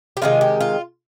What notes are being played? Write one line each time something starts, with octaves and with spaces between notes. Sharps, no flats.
G4
C3 D#3 G#3 F4
G4
F4